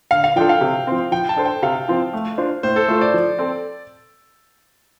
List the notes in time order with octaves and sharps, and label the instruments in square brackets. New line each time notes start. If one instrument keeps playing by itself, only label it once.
[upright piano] D3 [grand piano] F5
[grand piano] F5
[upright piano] F3 D4 F4 A4 [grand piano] G5
[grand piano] F5
[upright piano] C3
F3 C4
[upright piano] F3 [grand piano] G5
[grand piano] A5
[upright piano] D4 A4 C5
[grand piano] G5
[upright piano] C3 [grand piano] F5
[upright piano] F3 C4 F4
A3
D4 F4 C5
[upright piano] A2 [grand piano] C5
[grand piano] A4
[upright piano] A3 F4 [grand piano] C5
[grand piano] D5
[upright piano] F3
C4 A4